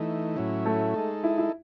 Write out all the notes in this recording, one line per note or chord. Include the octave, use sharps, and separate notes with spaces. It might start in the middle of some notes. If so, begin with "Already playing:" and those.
Already playing: E3 A3 D#4
A2 F#3 C#4 E4
A3
G#3 D#4 A4
E4
E4